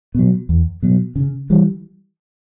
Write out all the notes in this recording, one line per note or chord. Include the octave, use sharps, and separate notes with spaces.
B2 F#3
E2
B2 F#3
C#3
E3 G3